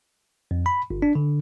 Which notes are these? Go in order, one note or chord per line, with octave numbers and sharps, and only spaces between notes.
F2
B5
G1
D4
D3